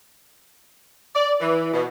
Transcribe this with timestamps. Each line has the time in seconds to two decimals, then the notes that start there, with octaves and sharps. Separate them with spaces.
1.15 D5
1.41 E3
1.74 B2